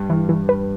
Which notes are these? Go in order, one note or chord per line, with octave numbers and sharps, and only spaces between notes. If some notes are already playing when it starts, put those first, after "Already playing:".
Already playing: G2
E3
E3
B4